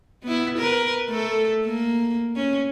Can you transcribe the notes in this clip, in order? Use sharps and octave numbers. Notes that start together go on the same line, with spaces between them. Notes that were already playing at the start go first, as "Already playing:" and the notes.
B3 E4
A#4 B4
A3 A4
A#3
C#4